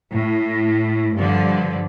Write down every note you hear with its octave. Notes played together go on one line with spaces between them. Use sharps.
A2
G2 D3 F3